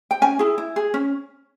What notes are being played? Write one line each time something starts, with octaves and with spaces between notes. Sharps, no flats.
G5
C#4 G#5
E4 G#4
E4
G#4
C#4